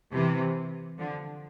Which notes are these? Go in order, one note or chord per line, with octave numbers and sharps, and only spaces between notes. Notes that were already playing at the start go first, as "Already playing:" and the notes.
C3 E3
D3 F3